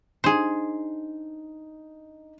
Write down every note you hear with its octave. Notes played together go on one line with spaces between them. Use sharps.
D4 D#4 G#4 C5